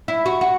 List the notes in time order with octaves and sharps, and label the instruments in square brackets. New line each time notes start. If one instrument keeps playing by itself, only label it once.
[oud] E4
F#4
F#4